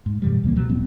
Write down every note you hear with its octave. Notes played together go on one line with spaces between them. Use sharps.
G#2
F#2 B2 E3 G3
C#2 E3 A#3
B2 F#3 G3
E1 A2 B3 C4